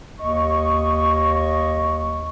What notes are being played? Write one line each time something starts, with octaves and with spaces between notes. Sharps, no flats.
D#2 D#5 C#6